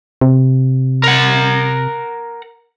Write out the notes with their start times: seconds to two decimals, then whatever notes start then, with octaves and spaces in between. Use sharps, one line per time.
0.21 C3
1.04 A#4 F#5